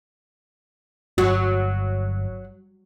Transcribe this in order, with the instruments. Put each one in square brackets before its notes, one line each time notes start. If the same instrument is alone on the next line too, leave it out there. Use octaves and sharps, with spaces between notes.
[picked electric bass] G1 [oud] F#3 [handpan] F#4